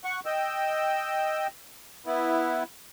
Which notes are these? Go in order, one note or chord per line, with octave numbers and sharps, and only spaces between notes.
F#5 C#6
D#5 G5 E6
B3 E4